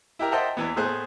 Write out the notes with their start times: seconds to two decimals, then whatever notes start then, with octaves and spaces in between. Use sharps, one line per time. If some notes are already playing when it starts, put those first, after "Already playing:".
0.19 E4 G4 A#4
0.32 C5 D#5 E5 F#5 G5 A5
0.57 E2 E3 B3
0.76 A2 B3 G#4 C5 F#6